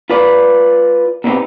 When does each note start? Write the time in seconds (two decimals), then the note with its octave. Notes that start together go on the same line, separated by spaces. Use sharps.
0.10 F4 B4 D5
1.24 B2 B3 C4 D#4 G4